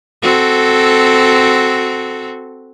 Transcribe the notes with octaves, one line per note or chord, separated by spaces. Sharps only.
C4 F#4 A4